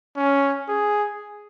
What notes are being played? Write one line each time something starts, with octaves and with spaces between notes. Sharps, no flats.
C#4
G#4